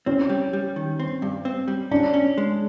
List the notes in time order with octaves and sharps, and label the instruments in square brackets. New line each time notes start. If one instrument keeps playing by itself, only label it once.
[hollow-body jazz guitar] C4 [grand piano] C#4
[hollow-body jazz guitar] G3
G3
D#3
C4
G2
C4
G3
[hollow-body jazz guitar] C#4 [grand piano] D4
[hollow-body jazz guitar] C#4
G#3